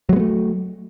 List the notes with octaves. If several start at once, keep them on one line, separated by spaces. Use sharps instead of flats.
F#3 G#3 A3 B3